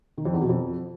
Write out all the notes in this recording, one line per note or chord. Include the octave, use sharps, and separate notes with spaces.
D#3
F2
E2
B2
F2